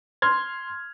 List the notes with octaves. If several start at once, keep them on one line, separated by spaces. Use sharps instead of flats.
C6 F6 G#6